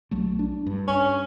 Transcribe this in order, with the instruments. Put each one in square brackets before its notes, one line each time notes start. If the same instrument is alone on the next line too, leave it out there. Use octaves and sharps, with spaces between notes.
[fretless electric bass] B1 F#3 A3
D4
G2
[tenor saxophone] C#4